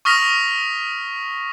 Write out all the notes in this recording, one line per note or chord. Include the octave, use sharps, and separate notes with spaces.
C#6 D#6 F6 A#6 B6 F7